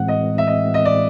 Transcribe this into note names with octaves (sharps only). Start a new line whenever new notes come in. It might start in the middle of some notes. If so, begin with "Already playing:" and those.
Already playing: A2 E3 G#3 C4 F#5
D#5
E5
D#5
D#5
D5